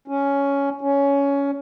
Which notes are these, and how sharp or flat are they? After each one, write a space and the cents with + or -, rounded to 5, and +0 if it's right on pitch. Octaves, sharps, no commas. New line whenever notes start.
C#4 +10
C#4 +15